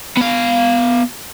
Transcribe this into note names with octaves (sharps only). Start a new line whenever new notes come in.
B3 F5